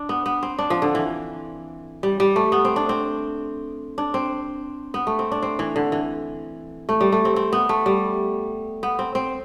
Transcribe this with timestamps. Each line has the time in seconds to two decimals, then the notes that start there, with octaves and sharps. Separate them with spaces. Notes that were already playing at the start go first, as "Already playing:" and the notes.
Already playing: D4
0.09 B3
0.26 B3
0.43 C4
0.59 D4
0.70 F3
0.82 D3
0.95 E3
2.03 G3
2.20 G3
2.36 A3
2.52 B3
2.65 C4
2.76 D4
2.89 C4
3.98 D4
4.14 C4
4.94 B3
5.07 A3
5.19 C4
5.32 D4
5.42 C4
5.59 E3
5.76 D3
5.92 E3
6.89 A3
7.01 G3
7.12 A3
7.25 C4
7.36 C4
7.53 B3
7.69 A3
7.86 G3
8.83 B3
8.99 C4
9.15 C4